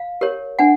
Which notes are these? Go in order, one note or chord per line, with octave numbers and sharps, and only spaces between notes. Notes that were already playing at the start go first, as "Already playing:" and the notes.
Already playing: F5
G4 A#4 C#5
D4 F#5 G#5